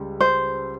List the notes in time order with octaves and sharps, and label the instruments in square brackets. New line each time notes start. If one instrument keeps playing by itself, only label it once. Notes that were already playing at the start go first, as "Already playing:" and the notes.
Already playing: [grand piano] C#2 C#3 G3
[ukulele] C5